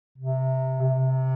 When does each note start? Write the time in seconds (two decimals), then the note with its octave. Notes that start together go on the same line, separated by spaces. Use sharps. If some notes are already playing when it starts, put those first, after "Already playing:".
0.18 C3
0.82 C3